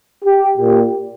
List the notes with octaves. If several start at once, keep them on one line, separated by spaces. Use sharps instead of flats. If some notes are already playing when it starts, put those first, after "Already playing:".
G4
A#2 G4